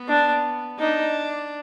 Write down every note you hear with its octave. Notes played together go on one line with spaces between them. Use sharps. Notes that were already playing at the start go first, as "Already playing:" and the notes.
Already playing: B3
D4
D4 D#4